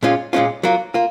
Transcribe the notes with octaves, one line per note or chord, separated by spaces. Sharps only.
A#2 G#3 C#4 F4
A#2 G#3 C#4 F4
F#3 A#3 F4
A#3 F4